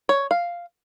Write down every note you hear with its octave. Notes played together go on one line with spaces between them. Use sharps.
C#5
F5